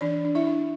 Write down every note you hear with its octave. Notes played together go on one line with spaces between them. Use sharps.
E3 D4 D5
D4
E4 E5
D4